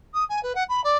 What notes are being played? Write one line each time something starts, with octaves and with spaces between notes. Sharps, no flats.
D#6
G#5
B4
F#5
B5
D5